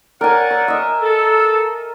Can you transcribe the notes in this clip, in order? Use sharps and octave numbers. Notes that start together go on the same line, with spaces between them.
A#4 C#5 D5 F#5 G#5
E6
D#5 E5
A4